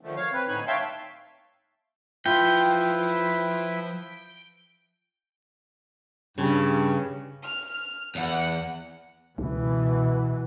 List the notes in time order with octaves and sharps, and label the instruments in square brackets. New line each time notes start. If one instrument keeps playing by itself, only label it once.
[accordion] D3 D#3 F3 A3
C#5 F5
C4 B4
A2 D3 D#4 C#5 G#5 F#6
C#5 E5 F5 G5 A5 C6
[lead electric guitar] F3 C6 [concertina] E4 B4 E5 [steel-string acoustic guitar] F4 [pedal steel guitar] G5
[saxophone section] G2 [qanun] C#3
[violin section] F6
[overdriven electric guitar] E2 [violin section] F#5
[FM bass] C#2 [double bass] B2 E3